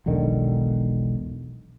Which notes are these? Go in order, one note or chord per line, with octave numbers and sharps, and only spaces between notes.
E1 B1 D3 D#3